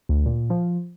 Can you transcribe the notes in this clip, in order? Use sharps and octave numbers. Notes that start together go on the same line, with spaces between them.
D2
A#2
F3